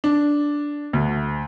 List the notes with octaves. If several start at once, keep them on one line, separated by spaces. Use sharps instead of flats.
D4
D2